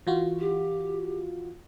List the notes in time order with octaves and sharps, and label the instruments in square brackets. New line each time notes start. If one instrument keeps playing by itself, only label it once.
[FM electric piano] E3 F4 F#4
[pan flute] G4